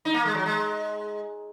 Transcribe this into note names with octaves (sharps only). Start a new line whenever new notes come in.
D#4
A#3
G#3
F#3
G#3